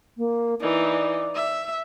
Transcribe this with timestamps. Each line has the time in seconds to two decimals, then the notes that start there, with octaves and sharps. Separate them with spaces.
0.18 A#3
0.61 E3 D#4 D5
1.35 E5